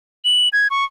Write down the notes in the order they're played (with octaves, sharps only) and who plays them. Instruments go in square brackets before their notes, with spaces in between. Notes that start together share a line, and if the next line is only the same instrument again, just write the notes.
[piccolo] F#7
G#6
C#6